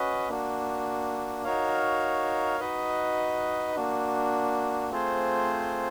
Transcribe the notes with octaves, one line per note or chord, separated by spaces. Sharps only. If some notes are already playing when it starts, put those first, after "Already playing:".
Already playing: C#4 F#4 B4 D#5
A#3 D4 F#4
D#4 F#4 A#4 C#5 F5
D#4 F#4 B4 D#5
A#3 D4 F#4
A3 C4 F4 G#4 C5